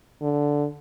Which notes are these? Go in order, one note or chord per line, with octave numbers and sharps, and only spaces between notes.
D3